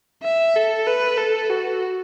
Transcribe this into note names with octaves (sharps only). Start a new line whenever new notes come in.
E5
A4
B4
A4
F#4